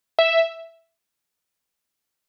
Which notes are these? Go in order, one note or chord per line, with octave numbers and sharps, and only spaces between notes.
E5